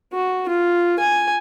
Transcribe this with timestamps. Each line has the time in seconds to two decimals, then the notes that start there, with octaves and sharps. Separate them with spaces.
0.13 F#4
0.48 F4
0.99 G#5